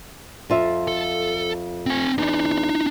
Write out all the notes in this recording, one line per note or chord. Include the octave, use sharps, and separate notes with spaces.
F2 F4 E5
A4
C4 G#5
E2 D4 D#4